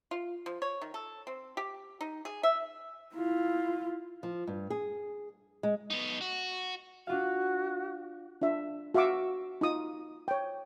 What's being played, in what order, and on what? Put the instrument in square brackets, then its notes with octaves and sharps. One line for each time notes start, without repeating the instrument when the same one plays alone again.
[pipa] F4
F3
C#5
D#3
A4
C4
G4
D#4
G#4
E5
[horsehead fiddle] E4 F4
[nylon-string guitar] F3
G2
G#4
G#3
[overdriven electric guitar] B3 D#4
F#4
[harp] D4 F4 F5 [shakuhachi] F#4
[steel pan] D4 F4 E5
F#4 E5 F5 C#6 D6 E6
D#4 F4 D#6
C#5 G5